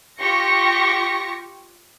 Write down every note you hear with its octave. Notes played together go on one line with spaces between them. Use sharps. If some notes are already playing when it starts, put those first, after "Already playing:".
F4 G4 C#6 A#6 C#7